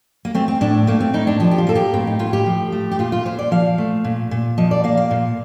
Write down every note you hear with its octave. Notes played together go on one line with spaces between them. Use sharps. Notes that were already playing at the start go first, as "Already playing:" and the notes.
A#3
A3 C4
C4
A2 D4
A3 A#3
C4
A2 D#4
D4
F3 D4
G4
F4
A#3 A4
G4
A2 C4
D#4
A2 F4
G4
F3
A3
G4
A#2 F4
F4
A#2 C5
D5
F3 F5
A3
A#2
A#2
F3 D#5
D5
A#3 F5
F5
A#2